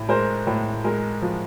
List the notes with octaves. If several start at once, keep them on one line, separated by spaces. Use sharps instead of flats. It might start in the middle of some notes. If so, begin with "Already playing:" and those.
Already playing: A2
G#3 A#4 C5
A2
G#3 A#4
F3